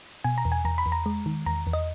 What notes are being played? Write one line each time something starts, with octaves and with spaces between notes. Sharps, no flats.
B2 G#5
A#5
E2
G#5
E2 A#5
B5
E2
A#5
G#3
D#3
E2 A#5
E2
D#5